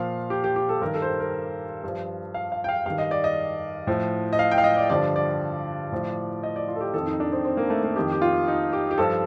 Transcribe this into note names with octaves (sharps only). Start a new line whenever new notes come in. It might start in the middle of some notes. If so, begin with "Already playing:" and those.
Already playing: A#2 F3 F5
G4
G4
G4
A4
G2 D#3 A#4
A4
C5
A#4
A#4
G2 F3
F5
F5
G5
F5
G2 D#3 F5
D#5
D5
D#5
A2 F3
D#5
F5
G5
F5
D#5
D5
G2 D3 F3 D5
D5
A2 F3
D#5
D5
F4
A4
G4
F2 D#3 A4
D#4
D4
C4
C4
A#3
A3
A#3
F2 D#3 G4
G4
F4
D#4
G4
G4
G2 F3 A4